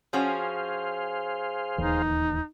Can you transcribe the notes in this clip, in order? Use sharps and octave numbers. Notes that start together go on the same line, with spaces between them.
F3 C#4 F#4 G#4 C5 F5
D1 D#2 E3 D#4